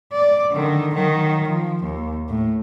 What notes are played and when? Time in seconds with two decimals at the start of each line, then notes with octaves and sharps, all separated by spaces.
0.12 D5
0.51 D3 D#3
0.94 D#3 F#3
1.48 F3
1.84 D#2
2.29 A2